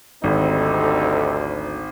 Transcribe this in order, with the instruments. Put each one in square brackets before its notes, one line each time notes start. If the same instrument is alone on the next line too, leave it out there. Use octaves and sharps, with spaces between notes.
[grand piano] G#1 [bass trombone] D2 [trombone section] G3 C4 D#4 [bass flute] A4